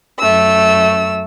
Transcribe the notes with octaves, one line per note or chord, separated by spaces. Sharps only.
F#2 A3 E6